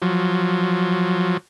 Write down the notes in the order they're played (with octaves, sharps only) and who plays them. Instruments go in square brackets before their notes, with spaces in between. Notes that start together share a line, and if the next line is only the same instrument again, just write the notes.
[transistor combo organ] F3 F#3